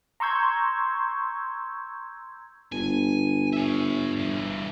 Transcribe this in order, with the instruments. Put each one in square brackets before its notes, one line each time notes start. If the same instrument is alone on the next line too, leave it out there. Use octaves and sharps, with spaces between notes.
[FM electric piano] A#5 C6 C#6 E6 G6 G#6
[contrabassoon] G1 [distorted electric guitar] G#5
[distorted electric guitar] C#5 E5
G2 E3